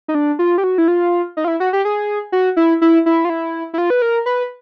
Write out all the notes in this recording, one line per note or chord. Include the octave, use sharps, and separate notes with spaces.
D#4
D4
F4
G4
F#4
E4
F4
D#4
F4
E4
F#4
G4
G#4
F#4
E4
E4
E4
F4
E4
E4
F4
B4
A#4
B4